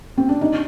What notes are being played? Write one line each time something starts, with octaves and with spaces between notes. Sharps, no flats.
C4
D4
D#4